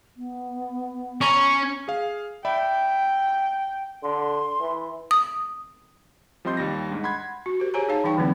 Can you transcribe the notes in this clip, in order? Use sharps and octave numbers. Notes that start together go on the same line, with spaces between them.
B3
C#4 A#5 C#6
G#4 F5
D5 E5 G5 B5
D3 C6
E3
D#6
F3 G3 C4 D#5 C6 G6
D#2 G3 A#6
G#2 D4
F#5 B5 C6 G#6
F#4
G4 A#4 C5
G4 G#4 C5 C#5 G#5 A#5
D#4 G#4 C#5 F5 A5
E3 G3 D#4 G5 C#6
D3 E3 F#3 A#3 C4 E4